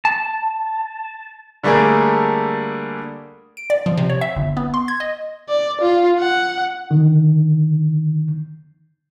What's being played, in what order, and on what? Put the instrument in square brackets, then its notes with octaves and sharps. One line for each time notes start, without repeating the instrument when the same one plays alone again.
[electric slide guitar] A5
[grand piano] D3 G3 A3 A#3 G#4 A#4
[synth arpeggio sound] D7
D5
F3
C3
C#5
E5
G1
B3
C6
G#6
D#5
[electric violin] D5
F4
F#5
[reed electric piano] D3 D#3